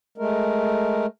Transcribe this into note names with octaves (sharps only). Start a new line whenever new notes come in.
G#3 A3 A#4